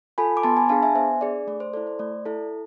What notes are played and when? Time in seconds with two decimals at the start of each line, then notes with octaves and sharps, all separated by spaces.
0.18 F4 A4 G#5 B5
0.37 D6
0.43 B3 A5 C6
0.57 G#5 B5
0.69 D4 G#4 F5 A5
0.83 E5 G#5
0.95 B3 C5 E5
1.21 D4 G#4 D5
1.47 A3 D5
1.60 C5
1.73 A4 D5
1.77 E4
1.87 C5
1.99 A3 D5
2.26 E4 A4